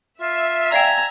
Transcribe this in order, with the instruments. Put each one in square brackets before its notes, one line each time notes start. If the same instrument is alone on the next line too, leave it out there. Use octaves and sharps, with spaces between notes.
[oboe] F4 [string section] E5
[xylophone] D5 F5 G5 [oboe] G#5 [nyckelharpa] A#5